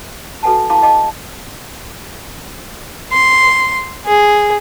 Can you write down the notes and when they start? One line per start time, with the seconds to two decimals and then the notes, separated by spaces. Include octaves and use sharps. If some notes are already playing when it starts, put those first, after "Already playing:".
0.43 F#4 A4 B4 F#5 G#5 A5
0.70 E4 F5 A5 A#5 C6 D6
0.83 D#5 F5 G5 A5 B5 D6
3.12 C6
4.05 G#4